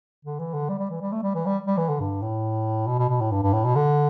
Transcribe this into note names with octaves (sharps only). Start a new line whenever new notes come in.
D3
E3
D3
G3
G3
E3
G3
A3
G3
E3
G3
G3
E3
D3
G2
A2
B2
B2
B2
A2
G2
G2
A2
B2
D3